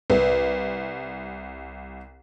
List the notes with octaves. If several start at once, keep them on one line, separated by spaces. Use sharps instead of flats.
C2 A#4 B4